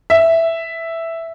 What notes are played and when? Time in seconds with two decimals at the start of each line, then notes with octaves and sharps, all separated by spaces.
0.10 E5